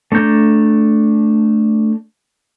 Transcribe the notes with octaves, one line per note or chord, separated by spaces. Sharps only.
A3 D4 A#5 G6